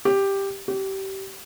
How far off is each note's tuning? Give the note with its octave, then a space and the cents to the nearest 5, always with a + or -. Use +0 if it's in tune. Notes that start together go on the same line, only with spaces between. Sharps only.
G4 +5
G4 -25